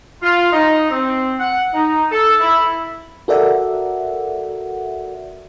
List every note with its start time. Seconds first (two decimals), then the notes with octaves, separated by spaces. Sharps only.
0.23 F4
0.53 D#4
0.91 C4
1.40 F#5
1.74 D#4
2.11 A4
2.40 E4
3.28 F#4 A4 A#4 D5 E5 F#5